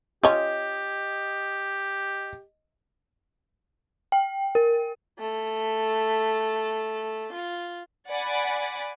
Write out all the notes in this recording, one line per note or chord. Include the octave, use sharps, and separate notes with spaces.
C#4 F4 G4 D#5
G5
A#4
A3
F4
D5 F#5 G#5 B5 D6